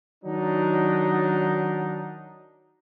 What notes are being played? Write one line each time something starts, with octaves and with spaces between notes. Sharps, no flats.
D#3 F#3 D4 D#4